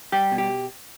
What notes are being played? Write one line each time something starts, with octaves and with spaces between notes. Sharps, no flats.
G3 G4
B2
G4